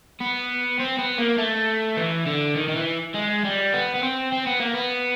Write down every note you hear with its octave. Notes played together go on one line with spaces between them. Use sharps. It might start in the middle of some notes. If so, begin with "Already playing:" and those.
B3
C4
B3
A#3
A3
E3
D3
D#3
D#3
E3
G#3
G3
B3
B3
C4
C4
B3
A#3
B3